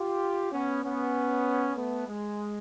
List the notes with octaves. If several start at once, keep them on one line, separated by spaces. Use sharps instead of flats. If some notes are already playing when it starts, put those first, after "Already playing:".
Already playing: F4 G4
B3 C#4
B3 C#4
A3 B3
G#3